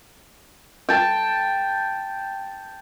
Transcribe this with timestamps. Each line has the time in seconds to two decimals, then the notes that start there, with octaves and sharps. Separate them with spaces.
0.89 G5 A5